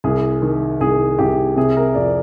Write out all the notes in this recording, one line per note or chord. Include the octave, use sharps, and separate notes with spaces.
C2 G#4
D#3
C2 G#4
C2 G4
C3 G#4
A#4
F2 D5